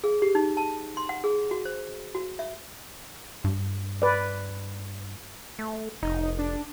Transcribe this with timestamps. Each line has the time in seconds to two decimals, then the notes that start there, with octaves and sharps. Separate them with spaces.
0.04 G#4
0.22 G4
0.35 D#4
0.57 A5
0.97 C6
1.09 F#5
1.24 G#4
1.51 F#4
1.65 C5
2.15 F#4
2.39 E5
3.44 G2
4.02 B4 D5
5.59 A3
6.03 F1 D#4
6.39 D4